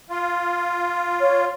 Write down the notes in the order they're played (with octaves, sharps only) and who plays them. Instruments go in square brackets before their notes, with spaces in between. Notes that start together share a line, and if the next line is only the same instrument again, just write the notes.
[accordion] F4
[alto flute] C#5